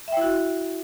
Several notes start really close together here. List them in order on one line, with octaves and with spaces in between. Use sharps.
E5 G5 E4 F#4